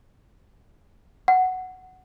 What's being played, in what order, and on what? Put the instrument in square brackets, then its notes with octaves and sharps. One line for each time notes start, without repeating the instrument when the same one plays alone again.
[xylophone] F#5